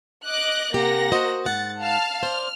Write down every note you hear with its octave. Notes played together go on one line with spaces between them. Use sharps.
D#5 D6 F#6
C3 A#3 G4 F#5 A#6
F#4 C5 D#5
G#2 F#5 A6
F5 A5 F6
C5 D5 F6